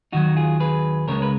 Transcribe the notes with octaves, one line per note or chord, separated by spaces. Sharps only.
D#2 D#3 F#3 D#4 F#4
F4 G#4
G#4 B4
C#2 C#3 G#3 A#4 C#5
B4